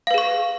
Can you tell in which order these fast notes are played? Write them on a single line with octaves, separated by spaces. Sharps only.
F5 B4 G#4 C#6